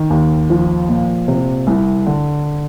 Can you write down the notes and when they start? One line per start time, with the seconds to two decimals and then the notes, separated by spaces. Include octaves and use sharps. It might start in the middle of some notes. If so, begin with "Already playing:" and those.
Already playing: D#3
0.10 D#2
0.50 F3
0.89 A#2
1.28 C3
1.67 C2
2.06 D3